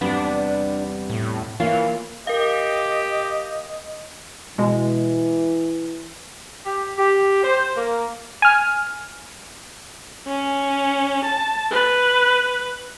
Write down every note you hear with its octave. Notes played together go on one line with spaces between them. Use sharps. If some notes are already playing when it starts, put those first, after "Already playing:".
E2 C3 G3 B3 D4
A2
E3 A#3 F4 C#5
G4 A#4 D#5 F5
B2 E3 G#3
G4
G4
C5
A#3
G#5 F6
C#4
A5
B4